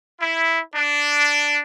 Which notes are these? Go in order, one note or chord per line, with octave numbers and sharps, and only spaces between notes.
E4
D4